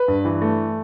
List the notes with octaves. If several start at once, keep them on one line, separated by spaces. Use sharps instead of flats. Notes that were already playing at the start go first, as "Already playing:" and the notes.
Already playing: B4
G2
E3
A3